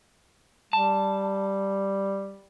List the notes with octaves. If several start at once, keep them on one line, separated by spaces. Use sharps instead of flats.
G3 A5